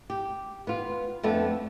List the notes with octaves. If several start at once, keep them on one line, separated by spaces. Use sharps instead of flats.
G4
B3 F4
F2 A3 B3 D4